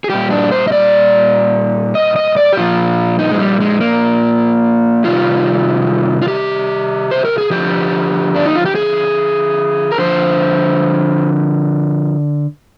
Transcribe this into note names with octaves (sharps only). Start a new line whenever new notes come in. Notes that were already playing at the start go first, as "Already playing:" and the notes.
G#4
A#2 G3 G4
D4
C5
D#5
D5
D#5
D#5
D5
G4
A#2 F3 F4
D#4
G#3
G3
G#3
A#3
C3 D#3 G3 F4
F4
G4
C5
A#4
G#4
D3 F3 G4
D4
D#4
F4
G4
G#4
A#4
D3 F3 C5